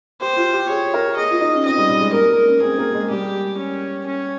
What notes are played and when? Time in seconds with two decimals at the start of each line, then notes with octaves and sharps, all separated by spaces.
0.21 G4 C5
0.37 F4
0.53 G4
0.69 G#4 C#5
0.94 A#4
1.17 G#4 D#5
1.31 F4
1.41 D#4
1.53 C#4
1.66 C4 D#5
1.78 G3
1.89 G3
2.01 G#3
2.13 A#3 A#4
2.30 A#3
2.45 C#4
2.61 C4 G#4
2.78 A#3
2.94 G#3
3.10 G3 G4
3.58 C#4
4.07 C#4